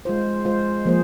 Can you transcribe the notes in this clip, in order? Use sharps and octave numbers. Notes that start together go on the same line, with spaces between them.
G#3 F4 C5
G#3 F4 C5
F3 A#3 G#4 C5